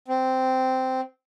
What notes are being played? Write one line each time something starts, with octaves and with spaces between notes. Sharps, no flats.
C4